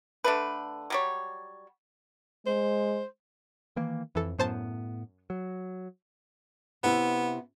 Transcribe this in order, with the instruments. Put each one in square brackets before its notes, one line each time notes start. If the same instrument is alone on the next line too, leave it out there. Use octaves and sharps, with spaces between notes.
[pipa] D3 A3 B4
F#3 G3 C#5
[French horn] G#3 [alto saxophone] C5
[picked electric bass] D#3 E3 A#3
[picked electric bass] F2 [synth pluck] E3 A4
[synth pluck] F#2 C5 A5 [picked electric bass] A2 B3
[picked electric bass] F#3
[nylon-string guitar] C3 E4 [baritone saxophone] B3